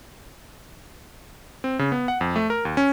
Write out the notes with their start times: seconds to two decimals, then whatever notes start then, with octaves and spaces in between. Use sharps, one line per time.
1.64 C4
1.79 C#3
1.92 B3
2.08 F#5
2.21 F2
2.36 A3
2.50 A#4
2.65 D#2
2.77 C#4